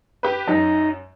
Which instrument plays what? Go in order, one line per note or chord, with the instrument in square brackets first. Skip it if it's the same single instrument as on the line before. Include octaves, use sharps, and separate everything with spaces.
[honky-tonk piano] G4 B4
[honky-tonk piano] F#2 [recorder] D#4